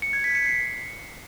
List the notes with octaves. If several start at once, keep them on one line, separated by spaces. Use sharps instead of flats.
C#7
G#6
B6
C#7
C7